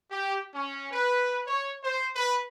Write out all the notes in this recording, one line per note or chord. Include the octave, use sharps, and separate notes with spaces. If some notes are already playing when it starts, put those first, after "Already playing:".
G4
C#4
B4
C#5
C5
B4